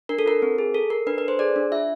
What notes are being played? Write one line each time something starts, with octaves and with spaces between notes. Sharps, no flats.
D4 A#4
A4
F4 A#4
C4
G#4
A4
A4 A#4
D4 B4
A4 B4
C5
G#4 D5
D4
F4 E5